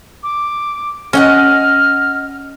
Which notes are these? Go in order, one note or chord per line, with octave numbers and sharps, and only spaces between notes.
D6
C#4 D#5 F5 F#5 F6